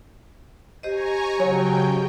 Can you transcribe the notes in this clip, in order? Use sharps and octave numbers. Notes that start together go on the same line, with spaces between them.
G4 C5 D#5 G#5 A#5 C#6
C#3 F#3 C#5 G5